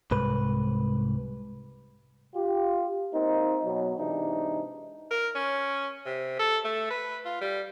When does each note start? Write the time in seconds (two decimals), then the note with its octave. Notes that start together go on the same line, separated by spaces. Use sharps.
0.11 C2 G#2 B4
2.35 F4 G4
3.14 A#3 C4 D#4
3.65 B2 F#3
3.98 G#2 C3 E3 D4 D#4
5.11 A#4
5.35 C#4
6.06 C3
6.39 A4
6.64 A3
6.90 B4
7.25 F4
7.41 G3